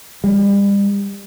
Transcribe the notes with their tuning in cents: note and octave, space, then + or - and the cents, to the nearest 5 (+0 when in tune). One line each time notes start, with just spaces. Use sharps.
G3 +35